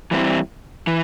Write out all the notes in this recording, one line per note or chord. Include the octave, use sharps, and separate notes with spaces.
E3 G3 C4 E4
E3